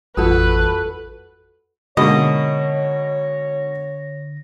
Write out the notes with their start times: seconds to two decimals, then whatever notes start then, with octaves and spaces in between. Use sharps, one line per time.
0.17 A1 F2 G3 F4 F#4 A4 B4
1.97 G#2 B2 D3 A#3 C#5 D#5 A#6